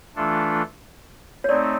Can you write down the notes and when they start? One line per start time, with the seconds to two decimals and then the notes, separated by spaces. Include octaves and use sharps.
0.16 E3 A3 D4 F4 A4
1.44 C#5
1.49 A3 C4 D#4 D5